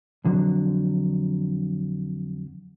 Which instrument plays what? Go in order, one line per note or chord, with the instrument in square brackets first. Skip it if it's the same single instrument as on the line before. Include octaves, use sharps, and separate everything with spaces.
[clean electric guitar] F2 D3 F#3